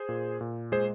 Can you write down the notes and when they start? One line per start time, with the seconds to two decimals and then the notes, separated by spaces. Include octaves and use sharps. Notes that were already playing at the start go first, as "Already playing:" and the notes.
Already playing: G#4 C5
0.09 A#2
0.41 A#2
0.72 G#3 G#4 C5